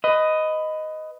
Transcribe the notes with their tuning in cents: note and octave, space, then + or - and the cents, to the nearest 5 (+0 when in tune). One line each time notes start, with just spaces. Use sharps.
B4 +20 D#5 +0